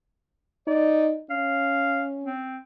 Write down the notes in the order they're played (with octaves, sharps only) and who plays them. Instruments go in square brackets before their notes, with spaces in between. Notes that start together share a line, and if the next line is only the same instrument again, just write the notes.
[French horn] D#4 [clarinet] D5
[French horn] C#4 [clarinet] F5
[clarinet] C4